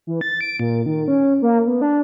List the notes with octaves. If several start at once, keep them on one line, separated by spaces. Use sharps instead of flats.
E3
A6
D7
A#2
D#3
C#4
A#3
B3
D4